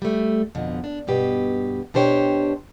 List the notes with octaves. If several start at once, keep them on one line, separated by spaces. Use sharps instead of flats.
G3 A3
F2 B2 D3
D4
G2 B2 G4 B4
B2 D4 G4 C5 C#5 G5